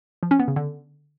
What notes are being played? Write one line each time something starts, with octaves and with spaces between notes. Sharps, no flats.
F3
C#4
B3
C#3
D3